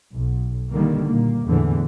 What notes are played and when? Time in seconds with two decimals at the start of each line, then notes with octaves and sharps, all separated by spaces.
0.16 B1
0.71 D3 D#3 G3 A#3
1.04 A#2 A#3
1.47 E2 A2 D3 E3